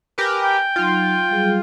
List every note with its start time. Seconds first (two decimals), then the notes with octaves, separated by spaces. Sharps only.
0.18 G4 A#4 B4 G#5
0.44 G5
0.76 F#3 D#4 F4
1.29 F#3 G3 G#4